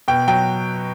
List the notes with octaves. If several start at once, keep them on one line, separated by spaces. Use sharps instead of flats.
B2 G5
F#3 G5